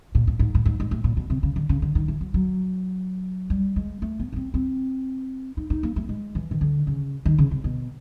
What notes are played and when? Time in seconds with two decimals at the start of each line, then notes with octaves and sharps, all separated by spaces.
0.15 A#2
0.27 A2
0.39 G#2
0.55 A2
0.66 G#2
0.80 G#2
0.91 A2
1.04 A#2
1.17 B2
1.30 C3
1.43 C#3
1.56 D3
1.69 C#3
1.82 D3
1.95 D#3
2.08 E3
2.21 F#3
2.34 F#3
3.50 G3
3.76 G#3
4.02 A3
4.20 B3
4.32 B3
4.36 C4
4.54 C4
5.57 D#4
5.70 D#4
5.83 A#3
5.96 A3
6.09 G#3
6.35 E3
6.51 D#3
6.61 D3
6.87 C#3
7.25 D#3
7.38 C#3
7.51 C3
7.64 B2